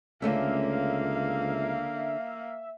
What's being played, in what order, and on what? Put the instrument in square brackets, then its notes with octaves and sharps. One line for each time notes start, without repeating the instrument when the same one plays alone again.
[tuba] C#2 [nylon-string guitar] D3 A3 C#4 [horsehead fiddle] A#3 F5 [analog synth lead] E5